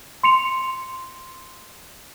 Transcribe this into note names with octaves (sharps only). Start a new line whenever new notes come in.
C6 C#7 F7